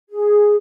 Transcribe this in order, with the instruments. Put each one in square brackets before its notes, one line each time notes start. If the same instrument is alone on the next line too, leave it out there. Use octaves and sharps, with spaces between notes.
[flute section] G#4